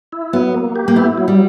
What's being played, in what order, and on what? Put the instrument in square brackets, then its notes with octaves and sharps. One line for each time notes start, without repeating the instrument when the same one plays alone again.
[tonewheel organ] E4
[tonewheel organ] F#3 [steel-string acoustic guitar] B3
[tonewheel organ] A#3
G4
[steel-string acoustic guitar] A#3
[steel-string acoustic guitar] B3 [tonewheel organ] E4
[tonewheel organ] F#3
[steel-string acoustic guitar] G3